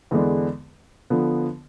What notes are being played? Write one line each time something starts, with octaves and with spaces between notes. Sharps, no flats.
E2 D3 G#3 B3 D4
D3 F3 B3